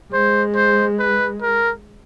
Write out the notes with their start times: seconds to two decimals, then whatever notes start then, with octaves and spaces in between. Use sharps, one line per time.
0.13 G#3 C5
0.56 C5
0.99 B4
1.42 A#4